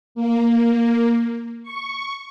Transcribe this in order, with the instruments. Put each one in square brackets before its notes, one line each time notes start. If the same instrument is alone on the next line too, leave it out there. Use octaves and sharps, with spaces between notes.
[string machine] A#3
C#6